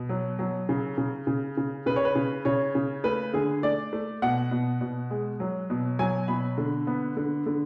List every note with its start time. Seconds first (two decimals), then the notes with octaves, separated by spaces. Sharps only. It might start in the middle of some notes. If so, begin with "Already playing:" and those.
Already playing: B2
0.09 F#3
0.39 F#3
0.69 C#3
0.98 C#3
1.27 C#3
1.57 C#3
1.86 C#3 B4
1.96 C#5
2.05 B4
2.15 C#3
2.45 C#3 C#5
2.75 C#3
3.04 A3 B4
3.34 D3 G#4
3.63 A3 D5
3.93 A3
4.22 B2 F#5
4.51 B2
4.81 B2
5.11 G#3
5.40 F#3
5.70 B2
5.99 F#3 G#5
6.28 B2 B5
6.58 D3
6.87 B3
7.17 D3
7.46 D3